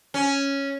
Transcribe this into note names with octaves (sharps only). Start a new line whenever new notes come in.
C#4